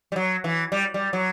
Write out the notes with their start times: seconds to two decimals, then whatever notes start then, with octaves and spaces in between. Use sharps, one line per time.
0.12 G3
0.16 F#3
0.44 E3
0.72 G3
0.94 G3
1.13 F#3